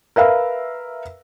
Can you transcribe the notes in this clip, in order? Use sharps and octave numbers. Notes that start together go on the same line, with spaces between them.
A#4 B4 E5 F5